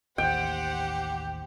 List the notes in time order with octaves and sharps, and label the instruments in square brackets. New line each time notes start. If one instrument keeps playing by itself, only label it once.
[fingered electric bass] A1 D#2 [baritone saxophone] G4 [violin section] C5 F#5 [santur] G5